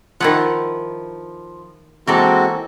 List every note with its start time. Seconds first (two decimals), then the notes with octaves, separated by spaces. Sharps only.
0.20 D#3 F3 E4 F#5
2.07 E3 G#3 A#3 C4 F#4 A4